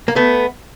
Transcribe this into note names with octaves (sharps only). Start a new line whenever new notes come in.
A#3
A3 B3